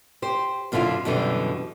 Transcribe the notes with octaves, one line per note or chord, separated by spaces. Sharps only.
G4 C5
F#2 B2 D3 E4 F4
F#2 B2 D3 E3 G3